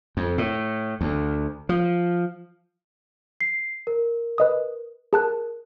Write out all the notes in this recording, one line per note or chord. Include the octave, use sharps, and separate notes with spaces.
F2
A2
D2
F3
C7
A#4
B4 D#5 D#6
G#4 A#4 A5 F#6